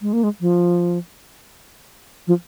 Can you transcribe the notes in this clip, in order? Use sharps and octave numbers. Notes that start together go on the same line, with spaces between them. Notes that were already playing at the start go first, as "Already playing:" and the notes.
G#3
A#3
G#3
F3
F3